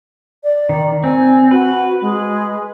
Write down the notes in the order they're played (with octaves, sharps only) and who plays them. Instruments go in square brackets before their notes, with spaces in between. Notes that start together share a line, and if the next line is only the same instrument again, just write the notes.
[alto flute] D5
[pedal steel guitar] D#3
[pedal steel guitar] C4 [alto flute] G#5
[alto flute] F#4 [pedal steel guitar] B4
[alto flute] G#3